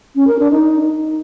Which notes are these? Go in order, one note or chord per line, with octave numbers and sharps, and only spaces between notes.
C#4
A#4
D4
D#4